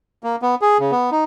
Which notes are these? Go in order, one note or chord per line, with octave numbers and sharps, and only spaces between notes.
A#3
B3
G#4
C#3
B3
D#4